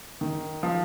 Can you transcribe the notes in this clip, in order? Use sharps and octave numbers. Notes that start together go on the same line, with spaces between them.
D#3
F3